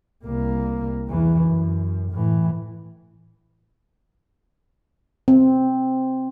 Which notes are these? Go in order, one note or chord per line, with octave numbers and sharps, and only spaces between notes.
C2 A#3
E2 E3
F#2
A2 E3
C4